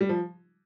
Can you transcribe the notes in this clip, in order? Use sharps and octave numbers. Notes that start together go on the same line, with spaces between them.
G3
F3